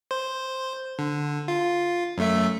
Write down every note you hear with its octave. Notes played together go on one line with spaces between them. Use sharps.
C5
D3
F4
F#2 A3 E5